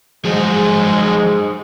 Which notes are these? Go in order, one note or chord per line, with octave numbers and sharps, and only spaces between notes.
F3 F#3 G#3 G#4 C5 D#5